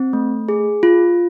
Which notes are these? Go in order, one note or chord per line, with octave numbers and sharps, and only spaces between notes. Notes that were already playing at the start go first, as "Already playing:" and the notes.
Already playing: C4
A3
G#4
F4